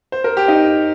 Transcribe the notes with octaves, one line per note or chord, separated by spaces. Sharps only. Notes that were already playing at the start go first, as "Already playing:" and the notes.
C5
A#4
G4
D#4